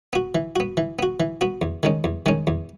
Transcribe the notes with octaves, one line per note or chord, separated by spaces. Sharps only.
B3 F#4
E3
B3 F#4
E3
B3 F#4
E3
B3 F#4
E2
D#3 G#3 C#4
E2
D#3 G#3 C#4
E2